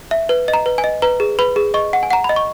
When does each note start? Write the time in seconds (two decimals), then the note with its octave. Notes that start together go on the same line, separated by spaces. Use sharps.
0.11 E5
0.29 B4
0.48 D#5
0.54 A#5
0.66 B4
0.78 G#5
0.84 D#5
1.02 B4 A#5
1.20 G#4
1.39 B4 B5
1.56 G#4
1.74 D#5 C#6
1.93 F#5
2.03 G#5
2.10 F#5 A#5
2.24 D#5 B5
2.36 C#6